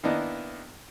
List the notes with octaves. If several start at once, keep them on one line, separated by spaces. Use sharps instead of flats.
D#3 A#3 B3 D4 E4 D#5